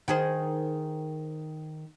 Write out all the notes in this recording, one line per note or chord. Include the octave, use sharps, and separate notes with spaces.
D#3 G#4 C5